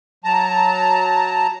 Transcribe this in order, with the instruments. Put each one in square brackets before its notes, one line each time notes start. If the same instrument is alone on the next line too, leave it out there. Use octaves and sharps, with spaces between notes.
[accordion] F#3 A5 A#5